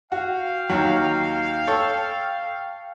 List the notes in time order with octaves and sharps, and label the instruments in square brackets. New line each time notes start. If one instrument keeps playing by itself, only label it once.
[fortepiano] F#4 [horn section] F5 G5
[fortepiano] D#2 F#3
A4 C#5 E6